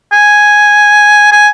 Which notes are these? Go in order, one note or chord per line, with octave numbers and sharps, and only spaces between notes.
G#5
G#5